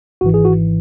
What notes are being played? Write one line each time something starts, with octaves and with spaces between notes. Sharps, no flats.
G#1 G#2 E3 F#4
G#4
F#4